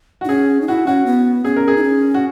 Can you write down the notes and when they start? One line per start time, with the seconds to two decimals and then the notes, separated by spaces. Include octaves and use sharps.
0.21 F#4
0.25 D#4
0.29 C#4 G#4
0.61 D#4
0.68 E4 F#4
0.87 C#4 F#4
1.06 B3
1.44 C#4 G#4
1.56 A#4
1.68 G#4
1.77 D#4
1.83 C#4
2.14 F#4